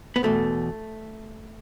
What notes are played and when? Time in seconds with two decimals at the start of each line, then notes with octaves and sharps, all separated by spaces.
0.16 B3
0.23 E2 B2 A3